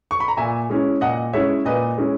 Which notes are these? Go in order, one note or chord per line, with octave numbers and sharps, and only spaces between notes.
C#6
B5
A#5
A#2 E5 G#5
G#3 C#4 E4
A#2 D#5 F#5
G#3 C#4 E4 C#5 E5
A#2 B4 D#5
G#3 C#4 E4